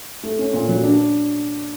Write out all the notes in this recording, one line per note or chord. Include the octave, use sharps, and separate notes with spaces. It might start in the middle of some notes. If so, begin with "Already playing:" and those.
A3
C#4
A#2
F#3
D4